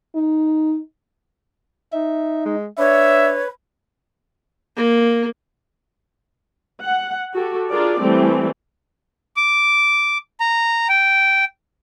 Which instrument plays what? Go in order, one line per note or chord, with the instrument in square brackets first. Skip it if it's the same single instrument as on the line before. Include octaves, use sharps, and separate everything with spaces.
[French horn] D#4
[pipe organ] D#4 [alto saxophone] E5
[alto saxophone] G#3
[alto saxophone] D4 [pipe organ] B4 [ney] C#5 [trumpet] E5
[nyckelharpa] A#3
[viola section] F#5
F#4 G4 A4
D4 F4 G#4 A#4 D5
E3 G3 A3 C4
[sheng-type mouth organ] D6
A#5
G5